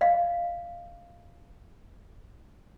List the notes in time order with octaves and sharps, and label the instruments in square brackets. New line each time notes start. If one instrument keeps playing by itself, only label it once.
[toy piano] D#5 F5